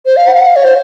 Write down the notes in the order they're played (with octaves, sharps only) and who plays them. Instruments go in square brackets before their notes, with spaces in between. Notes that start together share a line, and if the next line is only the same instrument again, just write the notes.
[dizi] C5
F5
F#5
F5
F#5
F5
C#5
C5